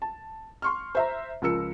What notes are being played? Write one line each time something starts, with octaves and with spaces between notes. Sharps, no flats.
A5
C6 C#6 F6
C5 E5 A#5
C#2 F3 A#4 E6 C#7